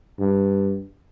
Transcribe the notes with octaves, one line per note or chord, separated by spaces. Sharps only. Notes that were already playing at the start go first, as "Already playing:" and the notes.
G2